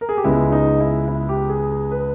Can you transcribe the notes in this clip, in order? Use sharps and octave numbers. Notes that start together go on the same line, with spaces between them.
A#4
G#4
G4
C#2 C#3 G#3 B3 E4
D#4
E4
E4
G4
G#4
G#4
B4